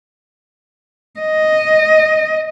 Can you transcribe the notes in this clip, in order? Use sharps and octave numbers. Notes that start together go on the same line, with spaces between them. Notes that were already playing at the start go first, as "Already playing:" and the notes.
D#5